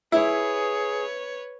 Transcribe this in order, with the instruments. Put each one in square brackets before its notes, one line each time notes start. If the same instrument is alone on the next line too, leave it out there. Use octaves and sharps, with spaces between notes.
[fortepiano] E4 [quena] G#4 [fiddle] B4 C#5